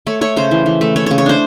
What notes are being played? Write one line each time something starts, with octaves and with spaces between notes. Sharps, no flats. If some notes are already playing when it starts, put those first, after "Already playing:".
A3 C#5
A3 C#5
C#3 C5
E3
E3
A3
A3 C#5
C#3 C#5
C#5
D4 C5